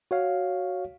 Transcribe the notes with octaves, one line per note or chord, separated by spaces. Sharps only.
F#4 C#5 F5